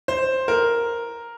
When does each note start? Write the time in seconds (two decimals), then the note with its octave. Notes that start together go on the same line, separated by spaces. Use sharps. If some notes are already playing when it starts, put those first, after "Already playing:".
0.08 C5
0.48 A#4